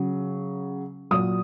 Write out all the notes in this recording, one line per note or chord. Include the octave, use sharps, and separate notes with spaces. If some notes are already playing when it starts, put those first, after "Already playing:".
Already playing: C#3 F#3
A#2 F#3 D#6